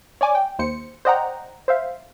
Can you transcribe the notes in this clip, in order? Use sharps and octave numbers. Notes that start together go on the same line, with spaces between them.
C#5 D5 G#5 D6
G5
D#2 C5 C#7
C5 D5 D#5 F#5 G5 A#5
C5 E5 F5